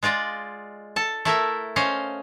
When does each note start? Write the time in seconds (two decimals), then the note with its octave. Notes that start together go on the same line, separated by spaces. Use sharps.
0.03 G#3 F4 D5 D#5
0.96 A4 A5
1.25 A3 E4 A#4 E5
1.76 C#4 C5 D#5 F5